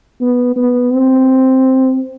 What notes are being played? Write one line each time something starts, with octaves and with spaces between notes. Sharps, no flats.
B3
B3
C4